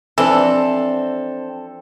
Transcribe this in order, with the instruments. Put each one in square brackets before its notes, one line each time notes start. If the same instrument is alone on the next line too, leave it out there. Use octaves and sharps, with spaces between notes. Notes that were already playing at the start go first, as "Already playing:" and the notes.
[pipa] E3 [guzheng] F3 D4 [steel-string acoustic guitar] C4 [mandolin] A4